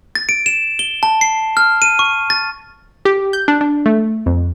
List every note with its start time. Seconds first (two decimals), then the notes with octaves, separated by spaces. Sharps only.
0.15 A6
0.29 D7
0.46 E7
0.79 G7
1.03 A5
1.21 C7
1.57 F6
1.82 D#7
1.99 C#6
2.30 A6
3.05 G4
3.33 G6
3.48 D4
3.61 D4
3.86 A3
4.26 F2